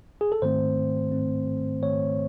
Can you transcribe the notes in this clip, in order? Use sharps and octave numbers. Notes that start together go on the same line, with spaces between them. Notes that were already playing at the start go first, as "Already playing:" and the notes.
G#4
A4
G#2 D#3 A3 C4 C5
G#2 D#3 A3 C4
G#2 D#3 A3 C4 C#5